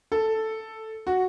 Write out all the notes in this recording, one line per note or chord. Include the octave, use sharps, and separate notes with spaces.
A4
F#4